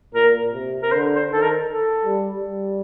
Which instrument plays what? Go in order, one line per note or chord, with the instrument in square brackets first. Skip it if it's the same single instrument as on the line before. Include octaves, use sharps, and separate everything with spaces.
[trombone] A#2 [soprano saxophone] A#4
[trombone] C3
[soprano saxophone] A#4
[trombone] D3 [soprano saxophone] C5
[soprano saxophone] C5
[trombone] D#3 [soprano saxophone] A4
[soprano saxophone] A#4
A4
[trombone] G3
G3